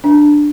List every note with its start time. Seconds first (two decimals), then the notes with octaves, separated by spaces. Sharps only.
0.04 D4